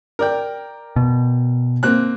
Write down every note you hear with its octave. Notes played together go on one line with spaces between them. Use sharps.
A#4 D5 G5
B2
A#3 C4 F#6